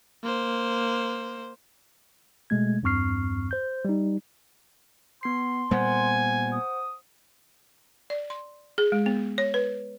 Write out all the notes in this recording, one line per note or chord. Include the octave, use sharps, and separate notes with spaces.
A#3 C5
B2 G#3 A3 G#6
E2 G2 C4 C#6 F6 C7
C5 G6
G3 D#4
B3 C6 C7
A#2 G3 B3 C5 F#5 G#5
D#6
D5
C6
G#4
G#3
B3
C#5
B4